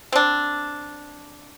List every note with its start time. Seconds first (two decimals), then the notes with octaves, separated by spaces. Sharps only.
0.12 C4 D4